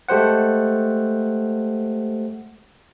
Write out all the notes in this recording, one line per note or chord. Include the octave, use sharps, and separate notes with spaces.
G#3 A3 G4 C5 F#5